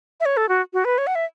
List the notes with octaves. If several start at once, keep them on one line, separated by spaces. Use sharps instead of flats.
E5
C#5
A4
F#4
F#4
B4
C#5
F#5
E5